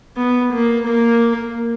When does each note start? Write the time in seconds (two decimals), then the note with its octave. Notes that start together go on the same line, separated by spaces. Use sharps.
0.17 B3
0.52 A#3
0.87 A#3